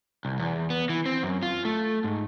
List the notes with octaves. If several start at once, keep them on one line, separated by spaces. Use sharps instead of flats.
C2
E2
B3
E3
C4
F#2
F4
A3
G#2